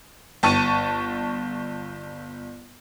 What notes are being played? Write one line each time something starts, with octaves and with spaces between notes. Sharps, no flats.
G1 A5 C#6 D#7